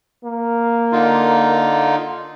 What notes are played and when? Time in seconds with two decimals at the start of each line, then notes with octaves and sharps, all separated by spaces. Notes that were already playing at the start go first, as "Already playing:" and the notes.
0.24 A#3
0.92 D3 D#4 F4